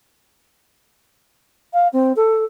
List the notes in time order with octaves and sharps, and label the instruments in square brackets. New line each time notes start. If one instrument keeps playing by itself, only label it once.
[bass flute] F5
C4
A4